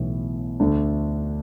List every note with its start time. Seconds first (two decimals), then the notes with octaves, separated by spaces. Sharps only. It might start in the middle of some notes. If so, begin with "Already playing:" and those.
Already playing: B1 A2 E3 B3
0.60 D2 D3 A3 D4